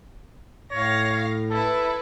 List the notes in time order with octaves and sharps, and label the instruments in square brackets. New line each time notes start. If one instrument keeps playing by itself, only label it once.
[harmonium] A2 [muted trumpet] C#5 [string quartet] F5 A#6
[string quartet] E4 B4 [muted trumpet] A4